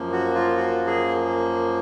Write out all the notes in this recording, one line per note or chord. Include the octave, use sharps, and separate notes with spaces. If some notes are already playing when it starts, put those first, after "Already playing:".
Already playing: F#2 F3 A#3
F#4
F4
F#4
G#4